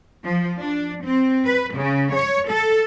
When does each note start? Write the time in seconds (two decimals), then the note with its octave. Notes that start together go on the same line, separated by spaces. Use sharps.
0.24 F3
0.59 D4
1.04 C4
1.45 B4
1.75 C#3
2.14 C#5
2.50 A4